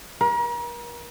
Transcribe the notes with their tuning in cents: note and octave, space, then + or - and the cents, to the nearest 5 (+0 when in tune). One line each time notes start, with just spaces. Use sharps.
A#4 +40